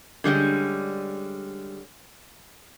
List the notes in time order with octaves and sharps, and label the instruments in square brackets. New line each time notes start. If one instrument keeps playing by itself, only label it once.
[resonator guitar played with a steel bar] D3 G3 G#3 C#4